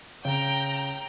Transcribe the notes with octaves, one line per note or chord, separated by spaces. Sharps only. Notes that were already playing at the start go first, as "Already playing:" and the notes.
C#3 G5 A#5